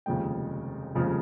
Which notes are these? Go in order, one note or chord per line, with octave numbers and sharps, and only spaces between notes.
F1 D#2 C#3 F3 G#3 G5
F1 D#2 C#3 F3 G#3